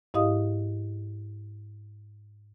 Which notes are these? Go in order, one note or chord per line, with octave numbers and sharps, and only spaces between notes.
G#2 E4 G4 D#5 F5 D#6